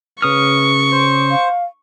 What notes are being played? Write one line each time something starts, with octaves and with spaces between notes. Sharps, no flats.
C#3 B4 C#6 D#6 F6
C5
F5